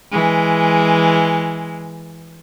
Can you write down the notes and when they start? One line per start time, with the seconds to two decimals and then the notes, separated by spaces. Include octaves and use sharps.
0.11 E3 G#3